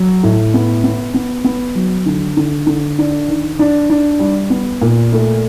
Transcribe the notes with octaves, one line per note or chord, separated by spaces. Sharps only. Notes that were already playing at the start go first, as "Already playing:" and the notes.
Already playing: F#3
A2
B3
B3
B3
B3
F#3
D3
D3
D3
D4
D#3
D4
D4
G3
B3
A#2
A3